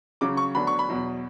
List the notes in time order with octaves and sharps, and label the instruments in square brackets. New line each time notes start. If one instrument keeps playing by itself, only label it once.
[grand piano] C#3 F#3 C#4 D6
C#6
D2 D3 F#3 B3 D4 B5
C#6
B5
E2 B2 F#3